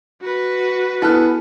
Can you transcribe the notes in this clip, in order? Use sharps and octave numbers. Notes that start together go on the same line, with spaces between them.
F#4 B4
B3 E4 G#4 A4 F6 F#6